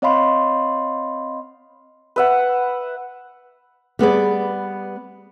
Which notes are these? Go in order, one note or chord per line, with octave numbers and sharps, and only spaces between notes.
C4 C#5 D#5 F5 B5 C6
B4 E5 F#5
G3 B3 G#4 D5